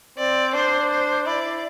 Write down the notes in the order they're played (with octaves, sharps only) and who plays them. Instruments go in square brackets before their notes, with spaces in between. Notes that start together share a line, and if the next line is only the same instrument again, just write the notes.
[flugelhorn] C4 [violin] D5
[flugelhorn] D4 [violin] C5
[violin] C5
[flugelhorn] E4 [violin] D5